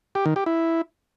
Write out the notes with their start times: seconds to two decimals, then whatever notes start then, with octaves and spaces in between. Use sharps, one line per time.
0.15 G4
0.26 D#3
0.36 G4
0.46 E4